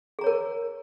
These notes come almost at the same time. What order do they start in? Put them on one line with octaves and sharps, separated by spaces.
G#4 A#5 C#5 A#4